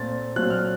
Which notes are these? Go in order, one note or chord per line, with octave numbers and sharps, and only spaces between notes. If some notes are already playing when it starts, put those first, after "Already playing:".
Already playing: A#2 A3 C4 A6
A#2 F#3 A3 C4 F#6
F6